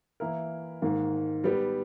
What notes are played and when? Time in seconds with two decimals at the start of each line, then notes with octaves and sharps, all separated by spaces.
0.20 E3 A#3 E4 A#4
0.82 G#2 D#3 A#3
1.44 G3 B3 G4